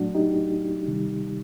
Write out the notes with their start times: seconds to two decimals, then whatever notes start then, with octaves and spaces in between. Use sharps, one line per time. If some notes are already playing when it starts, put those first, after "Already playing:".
Already playing: A2 F#3 A3 D4 F#4
0.15 D#4 G4
0.87 C3 D#3 G3